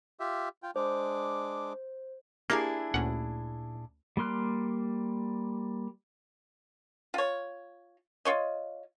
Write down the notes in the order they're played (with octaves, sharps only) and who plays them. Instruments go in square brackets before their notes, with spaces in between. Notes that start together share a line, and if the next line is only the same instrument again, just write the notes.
[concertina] F4 G4 E5
F4 G5
[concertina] G#3 D4 D6 [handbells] C5
[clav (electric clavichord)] A#3 [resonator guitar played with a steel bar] D4 E4 G#4 [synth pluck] G4 A#5 C7
[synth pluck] D2 C#4 [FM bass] A#2 [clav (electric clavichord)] F#5
[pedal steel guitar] G3 A#3 C6 F6 F#6
[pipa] F4 C#5
F4 C#5 D#5